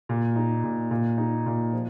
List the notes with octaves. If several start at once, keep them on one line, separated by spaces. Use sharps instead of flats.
A#2
D#4
A#2
A#2
D#4
A#2
F3